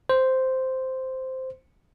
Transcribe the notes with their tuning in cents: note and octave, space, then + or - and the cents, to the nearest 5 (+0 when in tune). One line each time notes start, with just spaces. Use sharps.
C5 -5